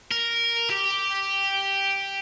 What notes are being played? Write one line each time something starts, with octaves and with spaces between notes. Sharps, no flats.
A#4
G4